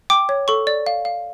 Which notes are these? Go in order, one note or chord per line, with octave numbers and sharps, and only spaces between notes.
G5 D6
C#5
A4 C#6
D5
F5
F5